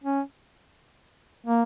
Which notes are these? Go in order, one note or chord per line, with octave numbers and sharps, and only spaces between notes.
C#4
A#3